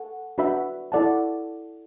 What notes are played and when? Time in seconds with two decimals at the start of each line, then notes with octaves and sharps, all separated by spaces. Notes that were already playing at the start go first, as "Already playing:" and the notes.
Already playing: A4 F#5
0.38 D4 F#4 B4 E5 B5
0.92 E4 A4 D5 F#5 A5